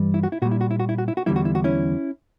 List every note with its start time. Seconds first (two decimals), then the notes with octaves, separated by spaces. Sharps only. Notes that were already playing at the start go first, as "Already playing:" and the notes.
Already playing: G2 E3 G3
0.14 E4
0.23 F#4
0.32 E4
0.42 A#2 G3 F#4
0.51 E4
0.61 F#4
0.71 E4
0.80 F#4
0.89 E4
0.98 F#4
1.08 E4
1.17 F#4
1.26 E2 D3 G3 E4
1.36 F#4
1.45 E4
1.55 F#4
1.64 C#4 E4